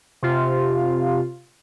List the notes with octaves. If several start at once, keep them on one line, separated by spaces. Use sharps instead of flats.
C3 F4